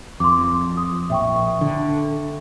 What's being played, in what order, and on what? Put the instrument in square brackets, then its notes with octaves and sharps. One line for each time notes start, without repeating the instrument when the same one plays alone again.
[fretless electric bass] F2 [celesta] C6 D6
[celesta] D#6
[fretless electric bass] A#1 [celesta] E5 G5 C#6
[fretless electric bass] D3